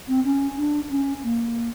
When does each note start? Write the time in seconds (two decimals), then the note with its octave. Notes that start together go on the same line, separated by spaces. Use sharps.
0.08 C4
0.24 C#4
0.57 D4
0.90 C#4
1.23 A#3